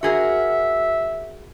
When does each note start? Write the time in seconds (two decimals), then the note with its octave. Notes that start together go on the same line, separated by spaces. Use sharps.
0.03 F#4 G#4 A#4 E5